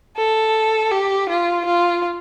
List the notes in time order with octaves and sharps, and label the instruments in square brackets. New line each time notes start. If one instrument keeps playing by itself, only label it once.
[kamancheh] A4
G4
F4
F4